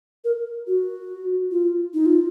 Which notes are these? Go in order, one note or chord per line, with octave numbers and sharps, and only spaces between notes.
A#4
F#4
F4
D#4
F4